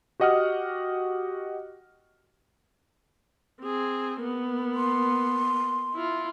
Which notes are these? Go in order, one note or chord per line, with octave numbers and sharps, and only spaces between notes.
F#4 G4 D#5 F#5 D#6 F6
C4 G#4
A#3 B3
C6
E4 F4